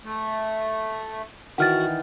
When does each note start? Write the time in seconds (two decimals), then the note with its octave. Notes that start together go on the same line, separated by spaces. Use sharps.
0.04 A3
1.58 D#3 E3 F#4 D5 F#5 F6 A6